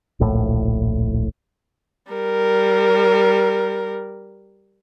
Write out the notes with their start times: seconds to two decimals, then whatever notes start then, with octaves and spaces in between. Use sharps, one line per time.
0.20 D1 A#1 A2
2.11 G3 A#4